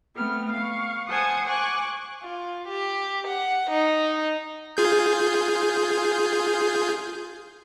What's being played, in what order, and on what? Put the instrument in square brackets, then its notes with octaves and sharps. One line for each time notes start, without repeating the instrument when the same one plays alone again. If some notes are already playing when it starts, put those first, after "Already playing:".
[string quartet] A3 B3 C4 F6
F5 C#6
C5 F#5 G#5 A5 D#6 G#6
G#5 C#6 D6 F#6
[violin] F4
G4
F#5
D#4
[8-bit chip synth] F4 G#4 G6